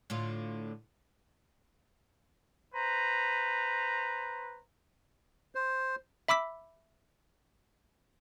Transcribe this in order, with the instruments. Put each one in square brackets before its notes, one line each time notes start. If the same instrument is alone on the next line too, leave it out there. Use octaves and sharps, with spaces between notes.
[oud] A2 D3 F4
[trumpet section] B4 C5 A#5
[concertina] C5
[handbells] E5 B5 D6 E6 B6